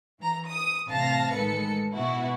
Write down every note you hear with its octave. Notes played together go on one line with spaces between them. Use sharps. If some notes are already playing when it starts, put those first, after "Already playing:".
E3 A#5
D#6
A1 C3 F5 A5 A#6
A1 D#3 G#3 A4 B4 C#7
B2 B3 E4 F#4